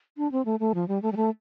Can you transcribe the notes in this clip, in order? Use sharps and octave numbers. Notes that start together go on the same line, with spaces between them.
D4
C4
A3
A3
F3
G3
A3
G3
A3